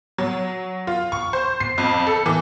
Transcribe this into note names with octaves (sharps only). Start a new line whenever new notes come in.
F#3
F4
C#6
C5
C7
F2
A4
E3